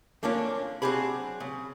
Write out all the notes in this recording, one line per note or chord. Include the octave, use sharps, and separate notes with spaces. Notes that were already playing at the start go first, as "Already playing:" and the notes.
F2 D3 A#3 C#4 D4 F4
F#3 C4 D4 G4 G#4 B5
C#3